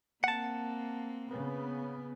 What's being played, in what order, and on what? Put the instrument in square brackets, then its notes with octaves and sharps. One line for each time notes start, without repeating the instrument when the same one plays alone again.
[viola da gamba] A#3 C4 [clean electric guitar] F#5 A5
[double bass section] C#3 B3